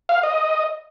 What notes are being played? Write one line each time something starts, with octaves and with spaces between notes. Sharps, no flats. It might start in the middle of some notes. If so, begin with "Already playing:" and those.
F5
D#5